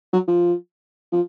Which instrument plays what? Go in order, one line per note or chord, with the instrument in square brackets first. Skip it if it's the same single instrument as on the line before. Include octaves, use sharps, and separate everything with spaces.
[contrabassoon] F#3
F3
F3